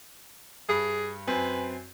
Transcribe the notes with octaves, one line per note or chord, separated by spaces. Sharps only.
G2 G#4
F#2 C4 B4 G#5